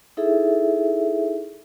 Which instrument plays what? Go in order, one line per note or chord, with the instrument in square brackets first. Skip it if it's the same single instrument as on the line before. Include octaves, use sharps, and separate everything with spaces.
[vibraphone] D#4 E4 G#4 A4 E5